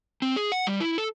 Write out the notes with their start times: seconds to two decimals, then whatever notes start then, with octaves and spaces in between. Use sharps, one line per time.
0.22 C4
0.36 G#4
0.52 F#5
0.67 G3
0.80 E4
0.98 A4